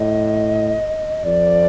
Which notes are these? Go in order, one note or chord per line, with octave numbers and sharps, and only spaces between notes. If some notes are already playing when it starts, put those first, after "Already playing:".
Already playing: A2 D#5
F2 D5